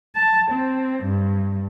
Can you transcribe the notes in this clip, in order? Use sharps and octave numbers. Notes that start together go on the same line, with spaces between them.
A5
C4
G2